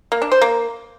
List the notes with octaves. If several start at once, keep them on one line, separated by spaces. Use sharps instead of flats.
A#3
D4
C5
A#3